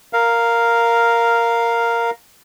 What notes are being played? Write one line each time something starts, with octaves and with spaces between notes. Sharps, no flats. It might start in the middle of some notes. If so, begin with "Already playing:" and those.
A#4 F5